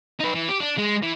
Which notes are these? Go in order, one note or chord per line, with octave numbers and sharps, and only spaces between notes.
D#4 B4
E3
G4
D4
G#3
E3